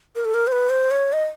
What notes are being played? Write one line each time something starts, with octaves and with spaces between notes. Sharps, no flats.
A#4
A4
A#4
C5
B4
C5
C#5
D#5